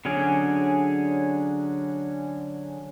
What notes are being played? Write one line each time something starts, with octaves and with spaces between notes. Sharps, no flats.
D3 F#3 C#4 G#4